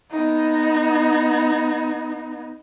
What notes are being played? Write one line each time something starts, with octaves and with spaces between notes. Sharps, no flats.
B3 D#4